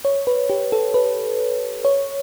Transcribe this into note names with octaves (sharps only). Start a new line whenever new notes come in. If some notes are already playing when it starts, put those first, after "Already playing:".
C#5
B4
G4
A4
B4
C#5